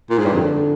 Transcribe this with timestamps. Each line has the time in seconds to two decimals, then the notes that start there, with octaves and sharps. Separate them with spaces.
0.10 A#2
0.18 G#2
0.25 G2
0.34 F2 D3